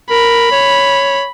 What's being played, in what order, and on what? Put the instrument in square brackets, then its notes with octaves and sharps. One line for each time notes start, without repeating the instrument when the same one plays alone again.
[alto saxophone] A#4 [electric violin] B5
[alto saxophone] C#5